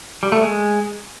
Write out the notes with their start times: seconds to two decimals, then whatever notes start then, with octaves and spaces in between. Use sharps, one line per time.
0.23 G3
0.32 A3
0.41 G#3